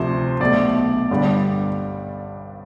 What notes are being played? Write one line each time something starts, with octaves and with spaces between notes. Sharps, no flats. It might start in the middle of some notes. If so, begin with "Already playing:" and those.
Already playing: D2 C3 F3 C5
B1 B2 A3 D5
G1 G2 D3 G3